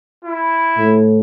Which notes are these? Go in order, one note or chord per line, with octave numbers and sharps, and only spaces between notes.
E4
A2